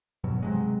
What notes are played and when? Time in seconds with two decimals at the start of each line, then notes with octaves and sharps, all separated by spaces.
0.24 G2 B2 F#3
0.42 C3 F#3 G#3